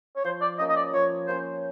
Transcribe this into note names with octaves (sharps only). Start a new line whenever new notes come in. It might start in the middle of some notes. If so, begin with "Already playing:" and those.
C#5
F3 C5
D5
A#3 C#4 D#5
D#5
D5
F3 C#5
A#3 C#4 C5